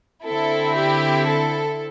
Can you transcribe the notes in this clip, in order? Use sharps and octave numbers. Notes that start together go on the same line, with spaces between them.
D3 C4 E4 A4
G4
A4